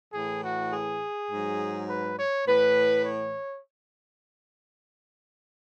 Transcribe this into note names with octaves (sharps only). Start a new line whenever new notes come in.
A2 E3 G#4
F#4
G#4
G#2 F#3
B4
C#5
A2 E3 B4
C#5